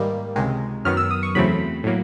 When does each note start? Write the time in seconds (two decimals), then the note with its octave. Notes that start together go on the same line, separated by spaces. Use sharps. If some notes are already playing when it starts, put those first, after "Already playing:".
Already playing: G#2 D#3 G3 A#3
0.36 C#2 C3 D#3 G#3
0.85 F#2 D#3 F#3 B3 F6
0.97 E6
1.11 D#6
1.23 C#6
1.35 E2 C#3 F#3 A3 C4 B5
1.84 A2 F#3 A#3